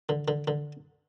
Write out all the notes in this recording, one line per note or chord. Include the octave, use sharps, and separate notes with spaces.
D3
D3
D3